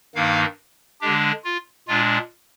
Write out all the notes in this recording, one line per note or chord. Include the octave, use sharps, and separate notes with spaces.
G2 D#3 A#3 D#4 F5
D3 G#3 D4 G4
F4
A#2 G#3 D4 F4